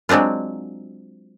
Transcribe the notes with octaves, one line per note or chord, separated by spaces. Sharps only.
F#3 G#3 C4 D4 F4